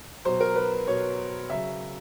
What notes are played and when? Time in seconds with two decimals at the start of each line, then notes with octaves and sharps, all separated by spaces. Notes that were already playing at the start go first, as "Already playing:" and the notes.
0.25 B2 F#3 C5
0.40 A#4
0.56 B4
0.88 B2 F#3 C#5
1.49 C#3 F#3 E5